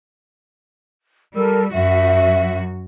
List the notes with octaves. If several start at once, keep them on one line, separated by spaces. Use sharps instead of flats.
G3 A4 A#4 E6
F#2 F#4 E5